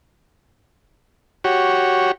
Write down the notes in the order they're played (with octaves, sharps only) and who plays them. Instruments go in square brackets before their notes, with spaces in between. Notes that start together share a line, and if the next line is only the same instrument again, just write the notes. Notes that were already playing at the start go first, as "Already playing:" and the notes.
[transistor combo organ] F#4 G4 C#5